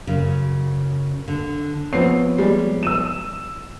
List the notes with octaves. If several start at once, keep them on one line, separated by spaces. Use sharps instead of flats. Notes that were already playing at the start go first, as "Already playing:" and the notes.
F#2 C#3
D3
F3 B3 C4 C#5 C7
G3 G#3
E6 D#7 E7